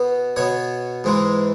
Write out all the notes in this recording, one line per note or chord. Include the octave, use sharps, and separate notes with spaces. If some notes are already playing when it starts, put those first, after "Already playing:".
Already playing: B2 B3
B2 B3 C#5
G#2 E3 G#3